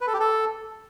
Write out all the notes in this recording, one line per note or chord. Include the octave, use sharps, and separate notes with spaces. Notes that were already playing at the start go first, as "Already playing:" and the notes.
B4
A4
G4
A4